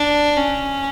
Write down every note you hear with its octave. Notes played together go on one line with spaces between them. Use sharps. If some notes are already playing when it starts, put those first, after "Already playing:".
Already playing: D4
C#4